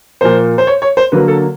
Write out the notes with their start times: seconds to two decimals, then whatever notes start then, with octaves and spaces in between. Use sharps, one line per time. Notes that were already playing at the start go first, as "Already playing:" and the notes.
0.21 A#2 F3 A#3 C5
0.58 C5
0.67 C#5
0.82 C#5
0.97 C5
1.12 D3 F#3 A#3 B4
1.28 A4